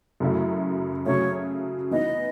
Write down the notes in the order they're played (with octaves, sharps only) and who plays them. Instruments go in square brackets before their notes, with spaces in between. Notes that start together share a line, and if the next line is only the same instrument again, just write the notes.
[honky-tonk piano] F#2 C#3 F#3 A3 E4
[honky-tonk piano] C#3 F#3 A3 [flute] C#5
[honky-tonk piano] E3 B3 D#4 [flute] D#5